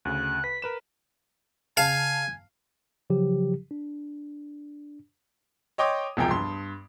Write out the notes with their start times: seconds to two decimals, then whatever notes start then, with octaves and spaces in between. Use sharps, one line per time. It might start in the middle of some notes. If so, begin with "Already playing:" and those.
0.05 D2 C#3 F#6
0.44 B4 B6
0.62 A#4 B4 E7
1.77 C#3 F5 G#5 A5
3.10 C#3 F3 F#3 G4
3.71 D4
5.78 C#5 D#5 G5 C6 D6 D#6
6.17 E1 C2 F3 G#4 G5 A#5
6.31 G2 C6